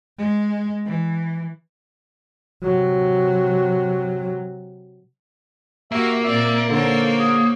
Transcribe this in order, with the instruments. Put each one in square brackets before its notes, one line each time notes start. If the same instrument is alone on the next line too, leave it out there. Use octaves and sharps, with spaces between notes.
[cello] G#3
E3
[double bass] C3 F#3
[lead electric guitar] A#3 [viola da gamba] F#4 G4 [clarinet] E5
[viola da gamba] A#2 C4 D5 [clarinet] E5
[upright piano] D3 [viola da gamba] D#4 C5 C#5 [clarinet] A4
[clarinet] G#4